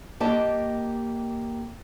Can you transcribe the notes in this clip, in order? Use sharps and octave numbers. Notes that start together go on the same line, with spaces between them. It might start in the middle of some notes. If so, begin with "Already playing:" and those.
A#3 G4 D#5 A5